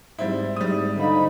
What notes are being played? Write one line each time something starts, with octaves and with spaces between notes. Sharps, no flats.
G#2 G3 C4 E4
G#2 G3 D#6
D3 D#4 C5 D#5 F5 B5